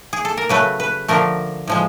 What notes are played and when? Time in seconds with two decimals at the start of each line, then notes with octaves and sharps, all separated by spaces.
0.13 G#4
0.25 A4
0.37 A#4
0.49 C#3 F#3 A3 B4
0.80 B4
1.08 D3 F3 A3 A#4
1.68 A2 F3 G#3